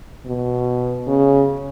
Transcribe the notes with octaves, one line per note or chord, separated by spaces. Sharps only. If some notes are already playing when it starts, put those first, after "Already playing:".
B2
C#3